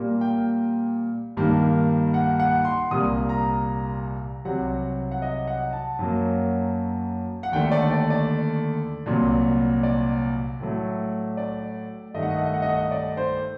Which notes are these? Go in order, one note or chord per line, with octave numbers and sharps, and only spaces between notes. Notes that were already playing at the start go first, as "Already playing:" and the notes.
Already playing: A#2 G3 A#3
G5
G2 D#3 G3 A#3
F#5
F#5
C6
C2 A#2 G3 A#3 D#6
A#5
C2 C3 F#3 F#5
F#5
D#5
F#5
A5
F#2 F#3 A#3
F#5
D#2 D3 A3 G5
D5
D5
D5
C2 A#2 F#3
D5
A2 F#3 A3
D5
G2 D#3 A3 D#5
F#5
D#5
F#5
D#5
F#5
D#5
F#5
D#5
D5
C5